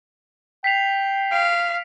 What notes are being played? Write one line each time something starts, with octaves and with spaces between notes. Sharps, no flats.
G5 B6 C7 F7
F5 D7